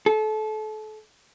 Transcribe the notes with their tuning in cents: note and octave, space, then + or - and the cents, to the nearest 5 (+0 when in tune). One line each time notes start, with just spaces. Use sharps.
A4 -30